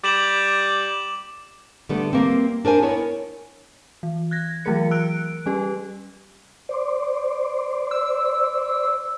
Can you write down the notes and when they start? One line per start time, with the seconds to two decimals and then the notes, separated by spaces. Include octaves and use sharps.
0.04 G3 D6 E7 F#7
1.89 D3 G3 A3 B3
2.13 G3 A#3 C4
2.65 D4 A#4 C5 G#5
2.82 B3 E4 A#4 C#5
4.03 E3
4.31 F#6 G#6 A#6
4.65 E3 F#3 A3 G#4 A#4 C#7
4.91 E6 F#6 D7
5.46 G3 C#4 G4 B4
6.69 C5 D5
7.91 E6